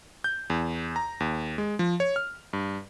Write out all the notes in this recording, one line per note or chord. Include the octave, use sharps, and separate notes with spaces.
G6
E2
A#5
D#2
G#3
F3
C#5
F6
G2